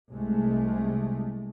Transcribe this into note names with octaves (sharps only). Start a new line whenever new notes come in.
C2 G#3 A3